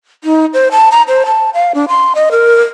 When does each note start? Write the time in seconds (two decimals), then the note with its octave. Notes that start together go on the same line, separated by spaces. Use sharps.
0.24 D#4
0.54 C5
0.72 A5
0.92 A#5
1.08 C5
1.26 A5
1.54 F5
1.75 D4
1.88 C6
2.15 D#5
2.31 A#4